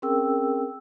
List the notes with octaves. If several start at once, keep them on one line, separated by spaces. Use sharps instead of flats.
C4 C#4 G#4 A#4 G5 E6